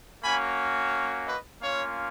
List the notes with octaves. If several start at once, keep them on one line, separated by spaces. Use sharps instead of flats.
A#3 C#4 F#4 G#5 B5
B4 D#5
A#3 C#4 F4 C#5 F5